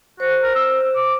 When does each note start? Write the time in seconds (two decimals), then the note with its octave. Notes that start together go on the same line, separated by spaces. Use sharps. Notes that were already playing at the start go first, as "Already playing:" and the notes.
0.20 F#4 C5
0.43 A#4
0.55 E6
0.96 D6